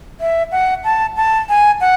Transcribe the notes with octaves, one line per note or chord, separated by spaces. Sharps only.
E5
F#5
A5
A5
G#5
F#5